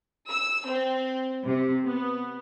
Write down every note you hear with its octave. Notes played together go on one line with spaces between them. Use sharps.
E6
C4
C3
B3